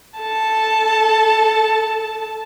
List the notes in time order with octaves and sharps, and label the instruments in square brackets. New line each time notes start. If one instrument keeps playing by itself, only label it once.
[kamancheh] A4 A5